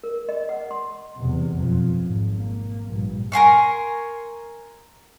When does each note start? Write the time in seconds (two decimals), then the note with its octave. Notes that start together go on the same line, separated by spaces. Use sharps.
0.04 A#4
0.29 D#5
0.49 F#5
0.71 C6
1.16 E2 C3
1.57 B1 F2
1.99 G#1
2.36 A#3
2.88 A#1 G2
3.32 A#4 G#5 C6 C#6